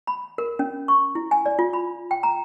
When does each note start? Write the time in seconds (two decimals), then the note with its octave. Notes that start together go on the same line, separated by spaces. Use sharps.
0.07 B5
0.38 A#4
0.59 C#4
0.88 C#6
1.15 E4
1.31 G#5
1.46 D5
1.59 F4
1.73 B5
2.11 G5
2.23 A#5